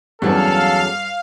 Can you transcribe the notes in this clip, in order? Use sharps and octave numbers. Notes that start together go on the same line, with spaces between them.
E2 G2 F#3 C#4 A4 F5